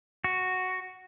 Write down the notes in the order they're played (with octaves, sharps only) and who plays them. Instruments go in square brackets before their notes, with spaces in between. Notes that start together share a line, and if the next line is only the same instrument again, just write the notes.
[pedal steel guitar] F#4